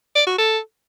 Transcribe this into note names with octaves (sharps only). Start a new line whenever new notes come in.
D5
F#4
A4